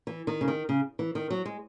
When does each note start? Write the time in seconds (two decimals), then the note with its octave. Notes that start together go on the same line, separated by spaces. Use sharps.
0.07 E3
0.27 D#3
0.41 C#3
0.48 D#3
0.69 C#3
0.99 E3
1.15 D#3
1.30 F#3
1.45 G#3